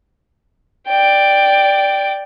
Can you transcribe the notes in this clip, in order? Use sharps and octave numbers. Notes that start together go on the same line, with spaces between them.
D5 G5